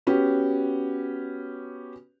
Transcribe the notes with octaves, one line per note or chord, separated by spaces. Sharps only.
B3 C#4 F#4 G4